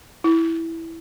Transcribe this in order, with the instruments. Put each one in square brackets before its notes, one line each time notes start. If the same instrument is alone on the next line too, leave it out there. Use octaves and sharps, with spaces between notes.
[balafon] E4